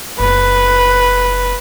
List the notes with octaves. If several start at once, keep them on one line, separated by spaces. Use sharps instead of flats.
F#1 B4